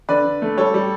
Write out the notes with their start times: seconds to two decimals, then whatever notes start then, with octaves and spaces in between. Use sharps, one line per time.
0.09 D3 B4 D5
0.25 D3
0.42 A3
0.58 G3 A4 C#5
0.74 G3